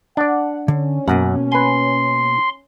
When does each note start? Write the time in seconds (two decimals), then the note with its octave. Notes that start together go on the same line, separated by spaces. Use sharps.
0.17 D4 D5 F#5
0.68 D3 C#4
1.08 F#2 B2 A#3 F#5
1.52 B4 G#5 C6